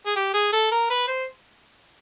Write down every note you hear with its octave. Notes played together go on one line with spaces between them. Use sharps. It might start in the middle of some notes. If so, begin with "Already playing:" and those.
G#4
G4
G#4
A4
A#4
B4
C5